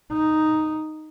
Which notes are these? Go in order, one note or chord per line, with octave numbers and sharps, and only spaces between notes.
D#4